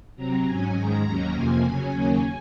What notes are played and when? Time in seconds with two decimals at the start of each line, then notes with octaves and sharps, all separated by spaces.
0.16 C3 F#3 C4 A#5
0.46 G#2 F#3 C#4 G#5
0.74 G#2 D#3 G#3 A#5
1.04 D#2 D#3 F#3 A#3 C#4
1.33 F2 C3 F3 A#3 G#5
1.62 C#3 F#3 C#4
1.92 D#2 C#3 F#3 A#3 C#4